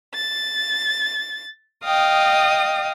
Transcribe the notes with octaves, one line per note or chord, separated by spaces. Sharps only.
A6
D#5 F5 G5 D#6